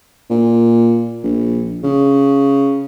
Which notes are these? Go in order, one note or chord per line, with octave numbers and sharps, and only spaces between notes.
A#2
A#1
C#3